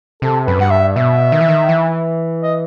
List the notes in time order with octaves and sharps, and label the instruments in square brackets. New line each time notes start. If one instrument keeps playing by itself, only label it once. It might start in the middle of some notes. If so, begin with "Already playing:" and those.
[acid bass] C3 [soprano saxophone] A4
[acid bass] F#2 [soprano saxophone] B4
[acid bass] G2 [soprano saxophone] F#5
[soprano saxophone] E5
[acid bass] B2 [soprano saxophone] E5
[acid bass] D#3
E3
D#3
E3
[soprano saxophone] D#5